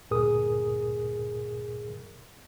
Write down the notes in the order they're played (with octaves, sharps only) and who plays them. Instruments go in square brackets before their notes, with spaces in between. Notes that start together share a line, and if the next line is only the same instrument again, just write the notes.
[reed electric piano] D2 G2 A#2 G#4 A#4 D#6